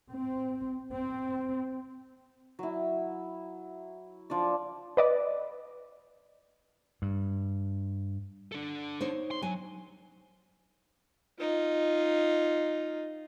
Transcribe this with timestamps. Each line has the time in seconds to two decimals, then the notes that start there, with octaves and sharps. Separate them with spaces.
0.11 C4
0.92 C4
2.59 F#3 E4
4.30 F3 D4 D5
4.97 B4 D5 D#5
7.02 G2
8.52 D4 A4
9.01 D#4 C5 C#5
9.31 C6
9.42 F#3 G#5
11.39 D#4 F4